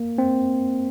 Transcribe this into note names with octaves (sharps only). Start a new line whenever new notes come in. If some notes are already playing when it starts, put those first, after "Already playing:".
Already playing: A#3
C4